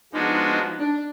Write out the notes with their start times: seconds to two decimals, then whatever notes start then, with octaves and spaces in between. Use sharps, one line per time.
0.13 F3 G#3 B3 D4 D#4 F#4
0.45 D#4
0.78 D4